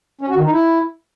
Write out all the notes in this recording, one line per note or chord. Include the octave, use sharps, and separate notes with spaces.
C#4
F#4
D#3
D#4
E4